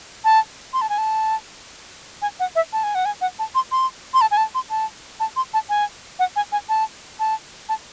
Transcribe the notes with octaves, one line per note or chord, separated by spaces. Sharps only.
A5
C6
A5
G#5
A5
G#5
F#5
E5
A5
G#5
F#5
G#5
F#5
A5
C6
C6
C6
A5
G#5
A5
C6
A5
A5
C6
A5
G#5
F#5
G#5
G#5
A5
A5
A5